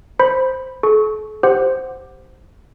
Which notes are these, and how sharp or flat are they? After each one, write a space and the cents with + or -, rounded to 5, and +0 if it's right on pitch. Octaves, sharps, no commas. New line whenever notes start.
C5 +0 B5 -5
A4 -45 C#6 +0
G4 +5 C5 +0 F#5 +0